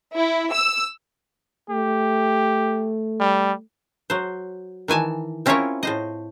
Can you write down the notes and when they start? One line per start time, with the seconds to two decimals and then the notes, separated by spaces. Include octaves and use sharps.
0.16 E4
0.52 E6
1.70 A3 G4
3.20 G3
4.10 F#3 C5
4.88 D#3 E3 G#5 A5
5.46 C4 C#4 E4 F4 A#4 C#5
5.83 A2 C5 D#5